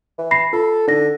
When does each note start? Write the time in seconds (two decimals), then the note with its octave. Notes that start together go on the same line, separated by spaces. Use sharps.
0.19 E3
0.31 B5 A#6 C7
0.53 F4 A4
0.87 D3 D#4 A#6